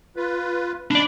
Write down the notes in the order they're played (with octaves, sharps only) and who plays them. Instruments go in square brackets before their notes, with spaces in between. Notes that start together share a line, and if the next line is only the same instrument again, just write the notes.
[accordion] F4 B4
[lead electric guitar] D4 D5 [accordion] B5